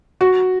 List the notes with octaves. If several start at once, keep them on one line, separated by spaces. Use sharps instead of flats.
F#4